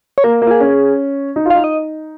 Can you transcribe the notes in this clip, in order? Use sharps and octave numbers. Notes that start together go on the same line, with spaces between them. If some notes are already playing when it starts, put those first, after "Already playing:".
C#5
A#3 A#4
A#3
F4
G#4
C#4
D#4
F4
D#4 F5
D#5